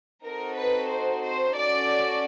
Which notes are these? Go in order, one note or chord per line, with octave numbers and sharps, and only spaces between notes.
C4 D#4 F#4 A4 A#4
B4
C5
C5
C#4 F#4 A4 D5